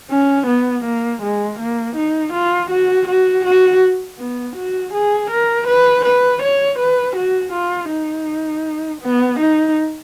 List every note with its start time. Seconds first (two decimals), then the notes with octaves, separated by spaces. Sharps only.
0.11 C#4
0.47 B3
0.85 A#3
1.22 G#3
1.59 A#3
1.96 D#4
2.33 F4
2.70 F#4
3.07 F#4
3.45 F#4
4.18 B3
4.56 F#4
4.94 G#4
5.30 A#4
5.67 B4
6.05 B4
6.42 C#5
6.78 B4
7.16 F#4
7.52 F4
7.90 D#4
9.01 B3
9.39 D#4